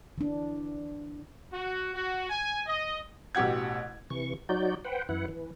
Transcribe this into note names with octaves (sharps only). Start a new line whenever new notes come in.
E3 D4
F#4
F#4
G#5
D#5
A1 B2 G4 F#5 G#6
C3 E3 C#6
F#3 D#4 F#4 D5 G6
B4 C5 F#5 G5
F#2 E3 E4 F#5
E3